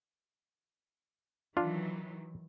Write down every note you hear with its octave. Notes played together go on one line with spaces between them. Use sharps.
D#3 E3 F#3 D4 F4